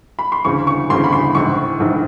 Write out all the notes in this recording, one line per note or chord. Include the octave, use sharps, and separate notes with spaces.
B5
C6
D2 C#3 E3 C#6
C#6
D2 C#3 E3 C6
B5
C6
A#1 G#2 E3 C#6
A#1 G#2 E3